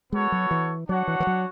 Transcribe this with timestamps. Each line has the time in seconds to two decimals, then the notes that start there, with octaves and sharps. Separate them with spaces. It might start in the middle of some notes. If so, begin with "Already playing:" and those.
0.12 G#3 B3 F#4 A4 C#5
0.32 F#3
0.51 E3
0.89 F#3 D4 F#4 C#5 F#5
1.08 E3
1.20 E3
1.27 F#3